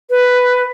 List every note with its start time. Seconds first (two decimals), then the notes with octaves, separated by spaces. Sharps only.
0.10 B4